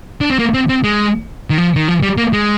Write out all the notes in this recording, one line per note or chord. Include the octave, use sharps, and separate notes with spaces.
D4
C4
A#3
C4
C4
G#3
D#3
F3
D#3
F3
G3
A#3
G#3